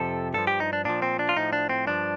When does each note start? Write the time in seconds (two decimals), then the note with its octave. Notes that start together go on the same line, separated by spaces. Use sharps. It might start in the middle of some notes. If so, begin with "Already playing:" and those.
Already playing: F2 C3 F3 A4
0.34 G2 F3 A4
0.47 G4
0.60 D#4
0.73 D4
0.85 A#2 F3 D4
1.02 C4
1.19 D4
1.29 F4
1.36 A2 F3 D#4
1.53 D4
1.69 C4
1.87 G2 F3 D4